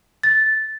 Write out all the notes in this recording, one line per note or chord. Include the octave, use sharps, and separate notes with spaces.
A6